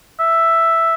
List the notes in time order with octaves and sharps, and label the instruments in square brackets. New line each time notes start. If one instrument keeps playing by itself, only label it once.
[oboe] E5